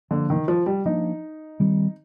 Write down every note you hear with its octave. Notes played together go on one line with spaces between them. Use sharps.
D3 F3 A#3 D4
D#3
F3
G3
F3 A#3 D4 D#4
D#3 G3 C4